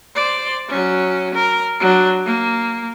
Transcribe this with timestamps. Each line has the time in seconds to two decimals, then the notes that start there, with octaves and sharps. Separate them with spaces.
0.16 C5 D5
0.69 F#3 C#4
1.34 A#4
1.80 F#3 D4
2.26 A#3